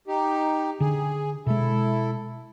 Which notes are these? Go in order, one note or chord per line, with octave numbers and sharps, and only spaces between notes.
D#4 G4
D3 G#4
B2 G#3 E4 A4